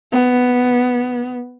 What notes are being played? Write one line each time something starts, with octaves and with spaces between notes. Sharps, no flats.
B3